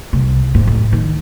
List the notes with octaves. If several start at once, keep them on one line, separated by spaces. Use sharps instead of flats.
C2
G#2
A1
D#3